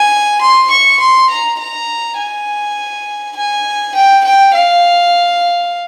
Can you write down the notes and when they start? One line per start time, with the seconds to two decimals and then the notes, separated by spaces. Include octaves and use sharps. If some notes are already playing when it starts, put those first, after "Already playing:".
Already playing: G#5
0.41 C6
0.71 C#6
1.00 C6
1.30 A#5
1.59 A#5
2.18 G#5
3.36 G#5
3.94 G5
4.24 G5
4.54 F5